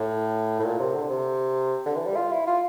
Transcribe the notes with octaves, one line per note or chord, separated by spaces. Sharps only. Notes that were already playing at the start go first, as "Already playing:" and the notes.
Already playing: A2
A2
A#2
C3
D3
C3
D3
E3
G3
F4
E4
F4